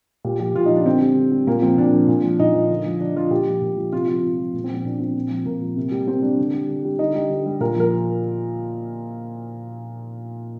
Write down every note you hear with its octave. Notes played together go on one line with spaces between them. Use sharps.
A#2 G4
F3 G4
A#2 F4
D#4
F3
D4
D3 C4
G3
D3
G3
A#2 A#3
F3 C4
A#2 D4
F3
A#2
F3
A#2 D#4
F3
D3
F3
D3 D4
F3 F4
A#2 G4
F3
A#2
F3
C3 F4
F3 F4
C3
F3
A#2
C4
F3
C4
A#2 D4
F3 C4
A#2
F3
A#2 A#3
F3
C3
G3
C3 C4
G3 D4
D3
G3
D3
G3
D3 D#4
G3
D3
G3
A#2 A#4
F3 A#4